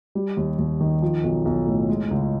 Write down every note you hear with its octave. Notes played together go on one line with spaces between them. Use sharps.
G3
D#2
D#2
D#3
F3
B1
B1
A2
G#3
C#2